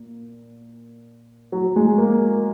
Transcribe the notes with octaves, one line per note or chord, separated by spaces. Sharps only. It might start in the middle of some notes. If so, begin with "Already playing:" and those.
Already playing: A#2
F#3
G#3
A#3